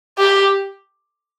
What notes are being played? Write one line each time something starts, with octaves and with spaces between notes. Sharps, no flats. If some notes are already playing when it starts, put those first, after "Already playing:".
G4